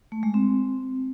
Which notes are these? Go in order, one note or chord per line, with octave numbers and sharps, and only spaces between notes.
A3
G#3
C4